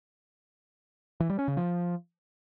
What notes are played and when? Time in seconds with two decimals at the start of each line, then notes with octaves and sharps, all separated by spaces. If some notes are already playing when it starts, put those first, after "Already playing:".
1.20 E3
1.30 G3
1.39 C#4
1.48 C#3
1.57 F3